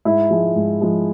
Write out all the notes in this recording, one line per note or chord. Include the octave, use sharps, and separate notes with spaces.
G#2 E4
F3 G#3
G#2
F3 G#3